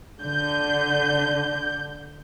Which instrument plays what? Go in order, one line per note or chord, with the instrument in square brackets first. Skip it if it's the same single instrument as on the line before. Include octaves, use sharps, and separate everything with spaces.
[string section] D3 G6